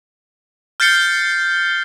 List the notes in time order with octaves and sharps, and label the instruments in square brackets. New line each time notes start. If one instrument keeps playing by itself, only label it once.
[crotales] F6 G6 A6 C7 C#7 G7